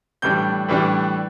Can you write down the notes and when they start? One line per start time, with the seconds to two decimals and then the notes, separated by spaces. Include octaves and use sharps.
0.22 A2 E3 G3 D4 G6
0.68 A2 E3 G3 D4